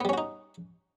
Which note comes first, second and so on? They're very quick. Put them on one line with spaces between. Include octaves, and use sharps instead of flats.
B3 G3 C#4 F#4 D#4